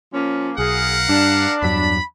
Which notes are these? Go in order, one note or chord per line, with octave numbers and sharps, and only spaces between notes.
F3 A#3 C#4
B1 G#4 A#4 F5 F#5
G2 D4
E2 G2 F#3 B5